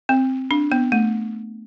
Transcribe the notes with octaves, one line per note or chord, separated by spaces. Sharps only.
C4
D4
B3
A3